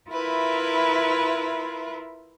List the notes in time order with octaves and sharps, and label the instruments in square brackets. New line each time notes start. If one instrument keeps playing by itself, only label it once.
[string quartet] E4 F4 A#4 B4 E5